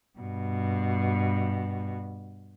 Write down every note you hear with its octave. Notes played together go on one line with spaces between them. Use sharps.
G2 B2